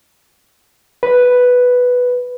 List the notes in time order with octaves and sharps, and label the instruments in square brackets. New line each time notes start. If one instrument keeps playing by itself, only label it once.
[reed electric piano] B4